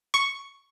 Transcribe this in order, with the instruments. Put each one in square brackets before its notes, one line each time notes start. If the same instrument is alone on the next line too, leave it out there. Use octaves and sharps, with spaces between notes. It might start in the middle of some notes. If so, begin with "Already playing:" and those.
[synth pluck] C#6